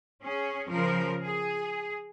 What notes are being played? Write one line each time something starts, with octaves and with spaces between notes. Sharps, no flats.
C#4 G#4
C#3 F3 A#4
G#4